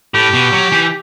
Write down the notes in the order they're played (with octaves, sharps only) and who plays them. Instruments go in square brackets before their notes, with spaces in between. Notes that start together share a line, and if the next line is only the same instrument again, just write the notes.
[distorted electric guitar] A2 [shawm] G4
[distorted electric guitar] B2
F#3
E3